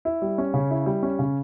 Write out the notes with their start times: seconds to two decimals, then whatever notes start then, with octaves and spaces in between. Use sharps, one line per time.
0.05 E4
0.22 G3
0.38 C#4
0.54 C#3
0.71 E4
0.86 G3
1.03 C#4
1.19 C#3